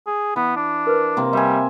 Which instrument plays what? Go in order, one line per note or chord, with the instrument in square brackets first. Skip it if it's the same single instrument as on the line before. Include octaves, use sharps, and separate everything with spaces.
[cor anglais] G#4
[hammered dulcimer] E3 [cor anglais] B3
[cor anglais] D4
[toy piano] A#4 B4
[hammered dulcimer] C3 A#3 C4
[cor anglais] G3 [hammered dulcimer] E5 G#5